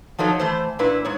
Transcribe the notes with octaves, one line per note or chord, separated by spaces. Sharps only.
F3 F#3 D#4 A4 C#5
E3 A3 C5
A#2 D4 E4 B4
G#2 C#5